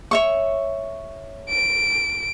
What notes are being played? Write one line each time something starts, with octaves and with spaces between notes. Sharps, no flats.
C#5 E5 C#6
D7